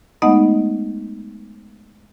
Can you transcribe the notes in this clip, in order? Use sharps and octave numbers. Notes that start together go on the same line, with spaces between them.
G#3 A3 B3 D#4 D#5 F#5